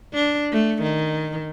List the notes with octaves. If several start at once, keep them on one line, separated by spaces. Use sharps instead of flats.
D4
A3
D#3